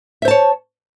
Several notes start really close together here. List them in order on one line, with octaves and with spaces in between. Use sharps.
E5 C5 A5 C#5